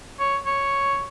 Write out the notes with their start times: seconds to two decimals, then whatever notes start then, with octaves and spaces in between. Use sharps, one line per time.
0.20 C#5
0.46 C#5